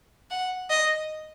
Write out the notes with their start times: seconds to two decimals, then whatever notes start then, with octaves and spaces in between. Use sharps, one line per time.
0.31 F#5
0.70 D#5